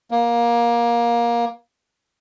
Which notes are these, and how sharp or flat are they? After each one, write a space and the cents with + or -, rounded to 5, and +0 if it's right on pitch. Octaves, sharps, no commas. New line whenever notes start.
A#3 +20